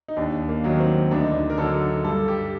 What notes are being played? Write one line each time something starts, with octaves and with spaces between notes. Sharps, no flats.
D#4
D#2 D4
A#3
D#3 F#3
C4
D2 D4
D#4
D4
A#4
D3 F#3 A4
G2 A4
G4